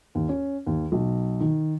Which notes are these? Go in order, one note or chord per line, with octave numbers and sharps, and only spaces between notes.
D#2
C#4
D#2
B1
D#3